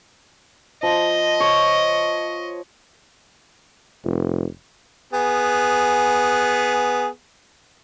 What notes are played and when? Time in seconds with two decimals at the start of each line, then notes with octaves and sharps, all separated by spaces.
0.83 F3 D#5
1.40 C#5
4.04 F1
5.13 B3 G#4